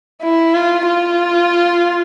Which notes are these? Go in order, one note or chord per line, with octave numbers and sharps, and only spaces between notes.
E4
F4
F4